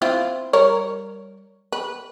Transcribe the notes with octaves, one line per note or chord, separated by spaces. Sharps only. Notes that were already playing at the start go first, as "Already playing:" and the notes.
C4 E4 F4
G3 A#4 C#5
B4